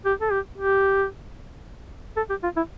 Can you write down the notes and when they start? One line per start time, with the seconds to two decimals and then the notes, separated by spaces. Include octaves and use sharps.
0.05 G4
0.21 A4
0.32 G4
0.58 G4
2.17 A4
2.30 G4
2.44 F4
2.57 E4